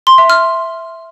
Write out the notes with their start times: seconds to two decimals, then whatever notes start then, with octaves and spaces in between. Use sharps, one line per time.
0.07 C6
0.18 E5
0.30 F6